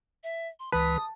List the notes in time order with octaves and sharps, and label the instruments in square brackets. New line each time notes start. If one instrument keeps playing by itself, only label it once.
[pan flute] E5
C6
[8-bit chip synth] C#2 E3 B6 [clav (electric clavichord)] B4 [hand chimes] A5 [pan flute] D#6